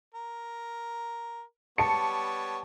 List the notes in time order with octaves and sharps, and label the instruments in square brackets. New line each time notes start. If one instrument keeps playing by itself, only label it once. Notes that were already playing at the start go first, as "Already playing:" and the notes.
[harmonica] A#4
[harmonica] G3 B3 C#5 [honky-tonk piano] A5 C#7